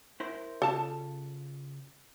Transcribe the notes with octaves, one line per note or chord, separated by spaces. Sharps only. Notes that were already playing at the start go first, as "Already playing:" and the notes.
E4 A#4 C5
C#3 F4 A4 A5